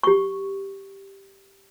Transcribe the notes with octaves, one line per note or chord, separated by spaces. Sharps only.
G4 C#6